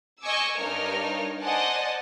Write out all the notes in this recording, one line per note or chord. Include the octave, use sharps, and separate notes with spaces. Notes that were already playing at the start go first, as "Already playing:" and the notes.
D#5 G#5 C#6 D6 E6
G2 D#4 A#4 C#5 F6
C5 D5 D#5 F#5 G#5 A5